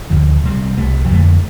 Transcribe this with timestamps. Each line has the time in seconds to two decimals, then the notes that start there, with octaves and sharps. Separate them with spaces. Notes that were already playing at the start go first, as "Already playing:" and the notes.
0.10 D2 D3 F3
0.44 C3 G3 C4
0.77 C2 C3 A3
1.09 F2 D3 A3